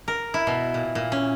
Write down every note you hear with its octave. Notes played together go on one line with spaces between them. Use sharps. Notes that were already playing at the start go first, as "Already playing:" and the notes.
A#4
E4
B2
A#2
A#2
C#4